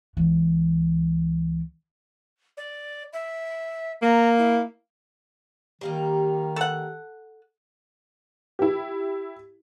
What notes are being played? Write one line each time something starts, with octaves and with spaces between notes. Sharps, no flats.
C#2 E3
D5
E5
A#3 A#5
E4
D#3 G3 A#3 D#4
A4 F#5
E4 G4